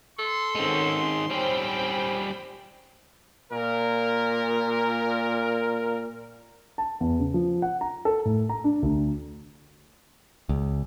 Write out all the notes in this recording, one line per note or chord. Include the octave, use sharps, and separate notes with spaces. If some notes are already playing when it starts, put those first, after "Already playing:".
A4 C6
D#3 G#3 C4 C#4 F#4
G3 C4 C#4 C5 G5 B5
A#2 A#4
A5
E2
C#3
F3
F#5
A#5
A4
A2
A#5
D4
D2
C#2